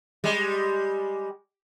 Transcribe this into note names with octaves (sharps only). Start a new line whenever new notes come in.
G3 G#3